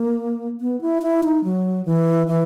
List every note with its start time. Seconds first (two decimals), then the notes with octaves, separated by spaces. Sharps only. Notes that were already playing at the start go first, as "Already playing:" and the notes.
Already playing: A#3
0.61 B3
0.81 E4
1.02 E4
1.24 D#4
1.44 F#3
1.85 E3
2.28 E3